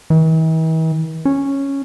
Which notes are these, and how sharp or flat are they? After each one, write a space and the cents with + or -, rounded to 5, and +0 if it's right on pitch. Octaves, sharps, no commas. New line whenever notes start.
E3 -45
C#4 -5